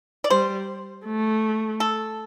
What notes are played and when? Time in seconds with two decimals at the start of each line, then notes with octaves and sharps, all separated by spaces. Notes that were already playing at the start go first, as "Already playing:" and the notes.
0.24 D5
0.30 G3 C5
1.06 A3
1.80 A4